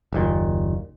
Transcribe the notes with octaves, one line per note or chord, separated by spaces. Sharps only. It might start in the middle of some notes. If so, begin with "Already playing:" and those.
F#1 D#2 A#2